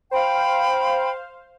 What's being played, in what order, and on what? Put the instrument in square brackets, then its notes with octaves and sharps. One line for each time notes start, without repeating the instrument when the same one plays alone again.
[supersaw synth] C5 F5 [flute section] G5 B5